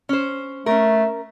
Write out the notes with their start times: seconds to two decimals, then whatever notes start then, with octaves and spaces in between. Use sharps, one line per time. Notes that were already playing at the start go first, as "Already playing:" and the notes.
0.09 C#4 C5
0.66 A3 C#4 A#4